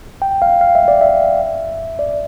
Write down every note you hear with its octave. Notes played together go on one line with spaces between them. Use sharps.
G5
F5
F5
E5
D5
E5
D5